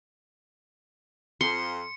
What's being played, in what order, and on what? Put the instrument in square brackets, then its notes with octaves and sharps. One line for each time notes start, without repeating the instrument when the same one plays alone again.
[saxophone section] F2 [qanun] C6 [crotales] C#7